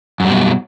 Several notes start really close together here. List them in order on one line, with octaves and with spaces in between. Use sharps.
F#2 G3 B2